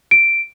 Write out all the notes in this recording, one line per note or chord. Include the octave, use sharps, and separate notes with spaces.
D7